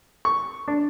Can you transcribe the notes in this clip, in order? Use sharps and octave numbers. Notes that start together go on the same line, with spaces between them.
C#6
D4